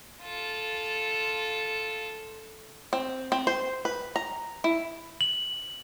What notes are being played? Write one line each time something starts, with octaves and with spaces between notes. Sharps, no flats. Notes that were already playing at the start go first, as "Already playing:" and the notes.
F4 A4
C4
C4
C5
B4
A#5
E4
F#7